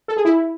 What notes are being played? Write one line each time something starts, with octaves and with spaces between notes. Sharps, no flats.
A4
G#4
E4